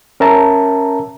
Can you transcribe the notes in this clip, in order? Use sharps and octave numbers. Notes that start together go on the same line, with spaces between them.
C#4 A#4 E5 A5 A#5